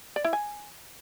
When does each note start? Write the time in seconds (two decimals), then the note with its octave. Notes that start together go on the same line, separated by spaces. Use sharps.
0.16 D5
0.24 E4
0.33 G#5